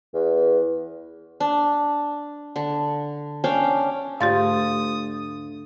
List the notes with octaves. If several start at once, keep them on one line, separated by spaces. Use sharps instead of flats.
E2
D4
D3
C#4 D4 F5 G5
D2 G#2 F4 G4 F5 C6 D#6 A6